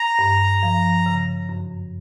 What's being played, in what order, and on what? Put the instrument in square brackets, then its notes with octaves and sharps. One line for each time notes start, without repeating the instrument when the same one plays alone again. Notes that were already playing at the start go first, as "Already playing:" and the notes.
Already playing: [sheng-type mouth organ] A#5
[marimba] G2
F3
C#3
F#2